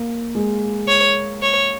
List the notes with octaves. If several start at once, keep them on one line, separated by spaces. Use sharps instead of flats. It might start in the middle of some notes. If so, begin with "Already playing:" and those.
Already playing: A#3
G#3
C#5
C#5